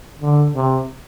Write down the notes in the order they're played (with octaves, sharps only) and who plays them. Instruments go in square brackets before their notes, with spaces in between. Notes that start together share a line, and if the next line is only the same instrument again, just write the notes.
[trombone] D3
C3